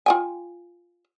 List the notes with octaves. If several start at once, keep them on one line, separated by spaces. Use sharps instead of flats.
F4 G5 G#5